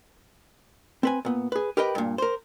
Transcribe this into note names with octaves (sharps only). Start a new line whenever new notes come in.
C4 B4 G#5
A#2 B3
G#4 B4
G4 A#4 B4 D#5 G5
G2 A#2
A#4 C5